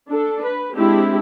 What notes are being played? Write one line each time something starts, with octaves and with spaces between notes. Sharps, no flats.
D4 A4
B4
G#3 C4 D4 E4 G4